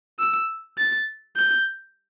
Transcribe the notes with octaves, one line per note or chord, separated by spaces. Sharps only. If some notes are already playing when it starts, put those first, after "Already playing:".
E6
A6
G6